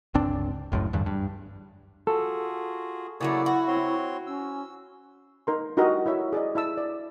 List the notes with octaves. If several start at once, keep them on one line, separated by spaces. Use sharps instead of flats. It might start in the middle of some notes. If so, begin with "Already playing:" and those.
G1 C#2 C4 D4
F#1 C#2 F#2 A2
E2 G2 D3
G2
F4 F#4 G#4 A4
C#3 F#3 A3 A#3 E4 G#4 D5
F#4
C4 C#5 C6
C#4 E6
D#4 A#4 C6
D#4 E4 F#4 G4 A#4 D#5
E4 C#5 E5
G#4 D5 D#5
E4 E5 A5 E6
D5